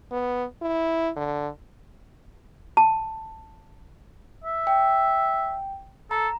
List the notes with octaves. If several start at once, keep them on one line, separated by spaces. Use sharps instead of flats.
B3
E4
D3
A5
E5
G5
A4 A#5